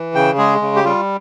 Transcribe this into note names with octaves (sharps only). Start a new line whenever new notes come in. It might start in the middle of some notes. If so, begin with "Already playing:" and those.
Already playing: E3
C#3 G5
G#3 G#4
C#3
G4
G3 F4